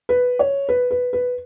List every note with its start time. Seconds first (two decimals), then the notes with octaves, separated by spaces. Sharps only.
0.09 B4
0.39 C#5
0.69 B4
0.91 B4
1.13 B4